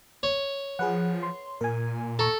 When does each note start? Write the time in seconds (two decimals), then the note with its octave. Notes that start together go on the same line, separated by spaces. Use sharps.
0.23 C#5
0.79 F3 G#4 B4 F#5
1.23 C6
1.61 A#2 A#4 G#5
2.19 A4 A#5 C#6